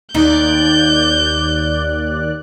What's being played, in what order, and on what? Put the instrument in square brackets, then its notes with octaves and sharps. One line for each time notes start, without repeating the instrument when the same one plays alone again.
[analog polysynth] D#2 D5 F#6 [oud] D#4 [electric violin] G6